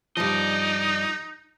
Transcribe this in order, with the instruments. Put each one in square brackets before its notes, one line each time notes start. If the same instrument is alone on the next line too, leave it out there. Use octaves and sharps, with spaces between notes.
[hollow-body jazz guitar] G2 F3 [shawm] D#4 [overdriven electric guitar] D5 D#5